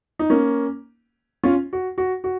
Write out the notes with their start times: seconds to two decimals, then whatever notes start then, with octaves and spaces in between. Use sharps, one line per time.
0.19 D#4
0.30 A#3 C#4
1.44 C#4 F4
1.73 F#4
1.98 F#4
2.24 F#4